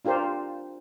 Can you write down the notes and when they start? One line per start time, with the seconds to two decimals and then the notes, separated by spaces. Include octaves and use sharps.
0.05 D4 F4 G4 A#4 C5